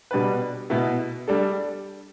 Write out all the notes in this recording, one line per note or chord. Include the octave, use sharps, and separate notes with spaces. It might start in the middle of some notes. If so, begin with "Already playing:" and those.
B2 G3 D4 B4
B2 B3 E4
G3 D4 A4